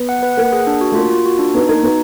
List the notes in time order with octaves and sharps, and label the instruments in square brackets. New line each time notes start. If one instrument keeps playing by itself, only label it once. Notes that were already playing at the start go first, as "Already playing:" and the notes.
Already playing: [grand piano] B3
[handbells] F#5
B4
[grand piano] A#3 [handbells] F#5
[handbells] G#4
D4
F#4
[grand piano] A3
[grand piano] A#3 [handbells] F4
[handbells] F4
F#4
D4
[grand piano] B3 [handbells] D#4
[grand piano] A#3 [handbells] D#4
[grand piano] B3 [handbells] F#4